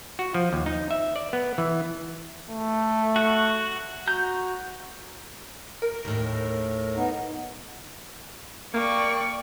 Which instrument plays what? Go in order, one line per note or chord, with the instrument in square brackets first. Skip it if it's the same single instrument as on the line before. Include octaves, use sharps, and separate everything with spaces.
[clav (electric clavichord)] F#4
F3
D#2
D#4
E5
D5
B3
E3
[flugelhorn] A3
[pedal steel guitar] F#4 F#5
[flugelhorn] F#4 [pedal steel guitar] A#5 G6
[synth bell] A#4
[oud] D#2 A2
[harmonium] B3 D#4
[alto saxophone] A#3 [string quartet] D5 G5 C#6